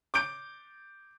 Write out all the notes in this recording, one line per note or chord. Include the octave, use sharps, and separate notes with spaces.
D6 G6 D7